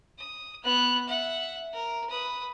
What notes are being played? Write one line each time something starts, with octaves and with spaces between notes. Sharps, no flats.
D#6
B3 F#6
E5 F#5
A#4
B4 D#6